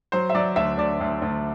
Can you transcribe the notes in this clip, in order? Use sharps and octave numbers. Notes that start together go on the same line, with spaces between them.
F#3 C5
E5
F#3 D5
D2 E5
D2 D5
D2
D2